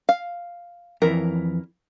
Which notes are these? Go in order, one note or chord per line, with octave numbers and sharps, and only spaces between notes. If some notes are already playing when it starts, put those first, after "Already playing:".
F5
F2 E3 A#4